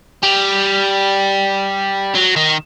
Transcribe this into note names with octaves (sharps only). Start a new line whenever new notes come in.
G3
F#3
D#3